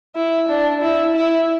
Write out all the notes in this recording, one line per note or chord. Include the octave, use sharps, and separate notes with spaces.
E4
D4
E4
E4